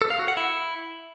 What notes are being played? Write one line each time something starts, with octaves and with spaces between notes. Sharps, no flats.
A4
F5
F#4
F#5
E4